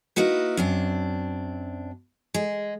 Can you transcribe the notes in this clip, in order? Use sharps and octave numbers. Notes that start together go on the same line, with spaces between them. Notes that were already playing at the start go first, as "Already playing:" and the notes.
A#3 D#4 E4 F#4 B4
F#2 C4 D4
G#3